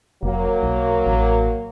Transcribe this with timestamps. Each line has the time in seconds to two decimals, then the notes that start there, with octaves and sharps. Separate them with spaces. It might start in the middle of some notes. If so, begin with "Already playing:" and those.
0.23 F1 F#3 A#3
0.63 B1
1.07 A1